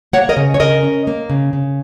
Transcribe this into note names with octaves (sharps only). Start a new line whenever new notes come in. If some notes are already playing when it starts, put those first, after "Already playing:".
A#3 C#5 F#5
A#4 D#5
C#3
C#5
C#3 A#4 D#5
C#4
A#3
C#3
C#3